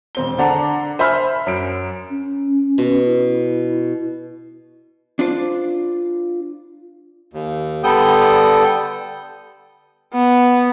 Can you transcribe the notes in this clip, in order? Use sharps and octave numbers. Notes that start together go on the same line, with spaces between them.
E1 C4 G7
D3 D4 F#5 A#5
C5 E5 G#5 B5 F6
F#2 D7
C#4
B2
E4
D4 F4 C5
D#2
D3 G3 B3 A4 G5 D#6
B3